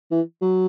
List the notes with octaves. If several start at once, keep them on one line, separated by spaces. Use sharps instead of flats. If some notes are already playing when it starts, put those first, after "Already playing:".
E3
F#3